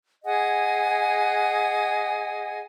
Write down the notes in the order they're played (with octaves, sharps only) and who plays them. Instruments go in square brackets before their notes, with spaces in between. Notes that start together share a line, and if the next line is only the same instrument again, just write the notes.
[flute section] G#4 D#5 F#5 G#5